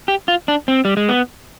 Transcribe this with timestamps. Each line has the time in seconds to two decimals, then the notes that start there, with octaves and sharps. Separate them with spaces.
0.08 G4
0.28 F4
0.48 D4
0.68 C4
0.85 G3
0.97 G#3
1.09 B3